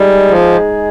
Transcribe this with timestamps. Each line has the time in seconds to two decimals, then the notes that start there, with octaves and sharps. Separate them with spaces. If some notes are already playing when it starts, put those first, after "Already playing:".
Already playing: G3 G#3 D#4 G#4
0.31 F3